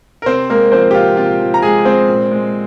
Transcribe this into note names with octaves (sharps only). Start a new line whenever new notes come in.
A#4
C3 C4 C5
G#3 A#3 A#4
F3 C4 C5
G4
C3 F4
C3 F4
F3
A#5
G#3 G#4 G#5
G#3 C4 C5
A#2
G#3